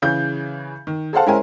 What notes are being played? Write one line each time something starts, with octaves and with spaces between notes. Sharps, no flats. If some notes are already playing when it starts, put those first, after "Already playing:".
C#3 E3 G#4 G6
D#3
G#4 A4 C5 F5 F#5 A5
G#3 C#4 E4 A#4 C5 G#5